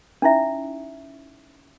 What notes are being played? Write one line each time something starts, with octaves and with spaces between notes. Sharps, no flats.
C#4 D#4 E4 E5